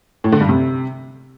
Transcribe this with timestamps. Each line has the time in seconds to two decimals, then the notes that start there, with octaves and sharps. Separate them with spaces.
0.24 A2
0.32 D3
0.41 G2
0.49 C3